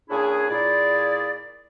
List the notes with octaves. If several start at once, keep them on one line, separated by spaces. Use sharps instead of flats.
A#2 C#4 D4 E4 G#4
A#2 E4 G#4 D5